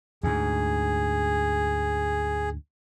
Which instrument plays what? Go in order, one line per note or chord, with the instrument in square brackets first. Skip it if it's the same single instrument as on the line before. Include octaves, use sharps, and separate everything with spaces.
[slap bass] D2 G#2 [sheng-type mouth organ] G#4